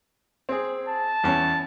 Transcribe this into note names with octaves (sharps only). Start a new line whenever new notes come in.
C4 G#4
A5
E2 C#4